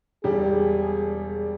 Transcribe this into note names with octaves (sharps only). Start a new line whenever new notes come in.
E1 G3 G4 G#4